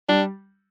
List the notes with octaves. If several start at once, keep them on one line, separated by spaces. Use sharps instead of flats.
G3 D4